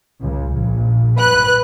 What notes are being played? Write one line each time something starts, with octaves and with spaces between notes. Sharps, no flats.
C#2
A#1
B4 F#6